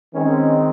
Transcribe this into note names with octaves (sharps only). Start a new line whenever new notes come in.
D#3 G#3 C4 C#4